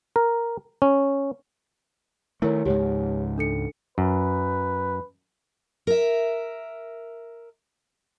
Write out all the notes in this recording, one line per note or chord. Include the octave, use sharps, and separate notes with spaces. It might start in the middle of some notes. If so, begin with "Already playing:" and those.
A#4
C#4
D#3 A3 E4 A#4 C#5
C#2 G#2 G4 C#5
D4 A4 C#7
F#2 B4
A#4 E5